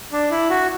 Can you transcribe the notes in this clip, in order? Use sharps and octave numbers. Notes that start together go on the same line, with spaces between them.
D4
E4
F#4